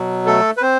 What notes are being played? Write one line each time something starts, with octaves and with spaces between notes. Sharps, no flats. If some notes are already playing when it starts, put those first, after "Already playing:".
Already playing: B2 F#3
A3 A4
B4
C4 C5